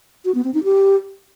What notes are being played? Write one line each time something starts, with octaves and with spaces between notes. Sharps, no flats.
F#4
B3
C4
D#4
G4